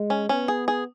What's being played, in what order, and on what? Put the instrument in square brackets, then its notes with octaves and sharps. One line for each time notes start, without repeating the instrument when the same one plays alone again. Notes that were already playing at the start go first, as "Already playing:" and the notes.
Already playing: [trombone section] G#3
[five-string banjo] C#4
[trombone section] B3 [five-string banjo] C#4
[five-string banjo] G#4
G#4